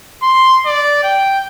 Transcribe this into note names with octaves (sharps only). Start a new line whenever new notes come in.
C6
D5
G5